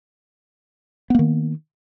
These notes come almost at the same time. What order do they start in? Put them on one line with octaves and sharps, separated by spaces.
B3 A#3 D#3